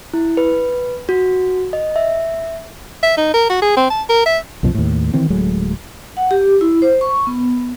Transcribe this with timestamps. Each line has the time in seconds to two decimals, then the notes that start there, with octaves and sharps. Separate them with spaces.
0.14 E4
0.37 B4
1.09 F#4
1.73 D#5
1.96 E5
3.03 E5
3.18 D#4
3.34 A#4
3.50 F#4
3.62 G#4
3.77 C4
3.90 A5
4.10 A#4
4.26 E5
4.63 C2 F#2 B2 F3
4.74 D#2 A2
5.14 D#3 E3 C4
5.30 D1 F#3 G#3 A3
6.17 F#5
6.31 G4
6.61 E4
6.82 C5
7.01 C#6
7.27 B3